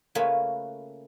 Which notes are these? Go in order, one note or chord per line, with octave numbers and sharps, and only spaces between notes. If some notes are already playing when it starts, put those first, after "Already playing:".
C#3 A3 A#3 C#4 F4 B4